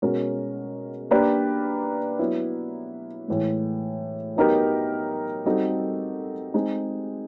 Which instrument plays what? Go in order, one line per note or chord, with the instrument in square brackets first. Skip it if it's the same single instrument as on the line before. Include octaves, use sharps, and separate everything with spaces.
[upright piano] B2 G#3 C#4 F#4 A#4
A#3 D4 G4 B4 D5
F#3 B3 E4
A2 E3 G#3
F#3 B3 D#4 G4 A#4
G3 C4 D#4 F#4 A4
G#3 C4 D#4 G#4